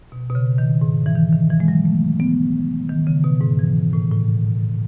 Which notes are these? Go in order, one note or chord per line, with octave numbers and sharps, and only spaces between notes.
B2
B2
C#3
D#3
G#2
E3
D#3
D#3
E3
G#3
F#3
A3
B3
D#3
C#3
B2
G#2
E3
A2
A2